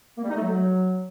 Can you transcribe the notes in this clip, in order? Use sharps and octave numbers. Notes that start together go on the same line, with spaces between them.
A#3
G3
D#4
A3
F#3